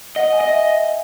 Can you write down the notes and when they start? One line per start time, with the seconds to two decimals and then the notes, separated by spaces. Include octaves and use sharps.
0.16 D#5 F#5
0.32 G#5
0.41 D#5
0.49 E5